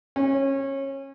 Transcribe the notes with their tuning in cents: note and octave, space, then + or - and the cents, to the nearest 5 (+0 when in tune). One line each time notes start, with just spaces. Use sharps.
C#4 -25